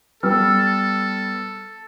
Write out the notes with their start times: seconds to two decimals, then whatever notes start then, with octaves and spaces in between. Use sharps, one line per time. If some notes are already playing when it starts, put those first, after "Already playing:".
0.23 G3 B3 A4 E6 F6